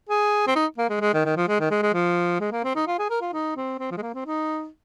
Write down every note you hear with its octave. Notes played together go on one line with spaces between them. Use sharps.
G#4
C4
D#4
A#3
G#3
G#3
D#3
D#3
F3
G#3
D#3
G#3
G#3
F3
G#3
A#3
C4
D#4
F4
G#4
A#4
F4
D#4
C4
C4
F3
G#3
A#3
C4
D#4